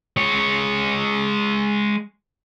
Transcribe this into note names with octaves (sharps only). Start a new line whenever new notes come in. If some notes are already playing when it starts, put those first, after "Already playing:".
G#3 C#5